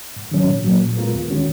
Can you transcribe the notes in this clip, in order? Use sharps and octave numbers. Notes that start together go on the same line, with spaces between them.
G#2
D#3 F#3 C#4
A#2
F#3 A#3
A#2
G#3 B3 F4 A#4
D#2
D#3 G#3 C#4 F#4